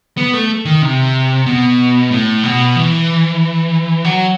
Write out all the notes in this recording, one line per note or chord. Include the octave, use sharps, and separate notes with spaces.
B3
A3
D#3
C3
B2
A2
B2
E3
F#3